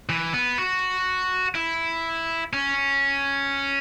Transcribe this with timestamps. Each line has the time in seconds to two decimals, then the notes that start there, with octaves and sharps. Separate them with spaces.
0.09 E3
0.34 B3
0.58 F#4
1.55 E4
2.53 C#4